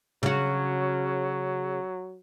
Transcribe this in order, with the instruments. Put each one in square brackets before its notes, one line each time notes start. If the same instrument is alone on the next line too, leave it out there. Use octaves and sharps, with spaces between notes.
[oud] C#3 F#4 [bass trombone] F#3